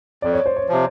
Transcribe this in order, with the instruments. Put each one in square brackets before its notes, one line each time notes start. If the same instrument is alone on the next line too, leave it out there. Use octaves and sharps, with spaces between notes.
[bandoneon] F2 [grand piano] D5
[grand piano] C#5
C5
C#5
[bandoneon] C3 F3